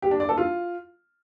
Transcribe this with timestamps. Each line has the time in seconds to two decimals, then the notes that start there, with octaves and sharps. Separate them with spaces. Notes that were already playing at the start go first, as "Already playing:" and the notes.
0.02 G4
0.11 D4
0.20 D5
0.29 A4
0.38 F4